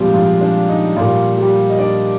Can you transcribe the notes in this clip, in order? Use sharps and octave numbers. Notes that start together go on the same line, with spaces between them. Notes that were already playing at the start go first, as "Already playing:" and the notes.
Already playing: A#2 F3 G3 G#3 C4 F4 G4
F3 F4
D4
D#4
A#2 F3 G3 A#3 F4
G3 G4
D#5
D4 D5